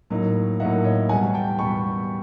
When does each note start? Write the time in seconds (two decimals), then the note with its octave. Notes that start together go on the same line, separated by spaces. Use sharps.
0.10 A2 F#3 A#3 D#4
0.60 A2 F#3 A#3 D#4 E5 F#5
0.84 C#5 D#5
1.09 E2 B2 G3 F#5 G#5
1.34 G5 A5
1.59 E2 B2 G3 B5 C#6